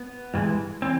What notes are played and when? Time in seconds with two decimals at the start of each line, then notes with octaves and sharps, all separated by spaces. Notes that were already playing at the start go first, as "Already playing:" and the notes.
Already playing: B3
0.34 G2 E3 G#3
0.82 E3 C4